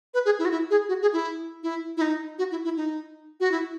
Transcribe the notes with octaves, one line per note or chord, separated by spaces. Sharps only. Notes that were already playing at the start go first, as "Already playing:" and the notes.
B4
G#4
E4
F#4
E4
G#4
F#4
G#4
E4
E4
E4
D#4
F#4
E4
E4
D#4
F#4
E4